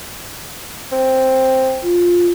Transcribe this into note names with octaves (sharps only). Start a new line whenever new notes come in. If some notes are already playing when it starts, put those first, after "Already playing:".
C4
F4